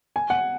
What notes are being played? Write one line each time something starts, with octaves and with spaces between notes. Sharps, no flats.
G#5
F#5